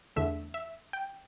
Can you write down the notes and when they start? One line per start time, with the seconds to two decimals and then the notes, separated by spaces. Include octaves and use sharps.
0.16 E2 D3 A3 E5
0.54 E5
0.93 G5